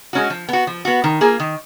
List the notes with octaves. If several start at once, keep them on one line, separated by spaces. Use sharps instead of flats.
G#3 C#4 F#4
F3
B3 F#4
F3
B3 F#4
D#3
A#3 F4 G#4
D#3